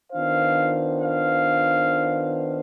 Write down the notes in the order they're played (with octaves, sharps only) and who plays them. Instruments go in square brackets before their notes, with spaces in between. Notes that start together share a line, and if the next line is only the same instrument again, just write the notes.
[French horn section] D#3 B3 D4 F4 C5 [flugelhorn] F5
[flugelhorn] F5